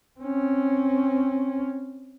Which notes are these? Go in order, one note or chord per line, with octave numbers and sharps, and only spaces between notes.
C4 C#4